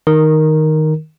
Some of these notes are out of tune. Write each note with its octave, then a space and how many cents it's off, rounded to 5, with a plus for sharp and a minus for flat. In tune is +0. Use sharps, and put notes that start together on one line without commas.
D#3 +0 A#4 +0